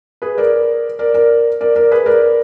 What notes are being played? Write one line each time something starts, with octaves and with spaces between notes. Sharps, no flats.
G#4 B4
A#4 D5
A#4 D5
A#4 D5
A#4 D5
A#4 D5
G#4 B4
A#4 D5